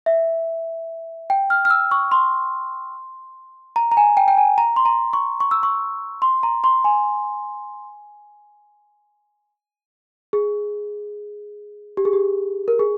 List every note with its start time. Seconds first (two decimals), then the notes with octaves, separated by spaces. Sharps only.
0.06 E5
1.30 G5
1.50 F6
1.65 F6
1.70 E6
1.91 C#6
2.12 C6
3.76 A#5
3.91 A#5
3.97 G#5
4.17 G5
4.28 G5
4.38 G#5
4.58 A#5
4.76 C6
4.85 A#5
5.13 C#6
5.40 C#6
5.51 E6
5.63 C#6
6.22 C6
6.43 A#5
6.64 C6
6.84 G#5
10.33 G#4
11.97 G4
12.05 G#4
12.13 G4
12.68 A#4
12.79 G#4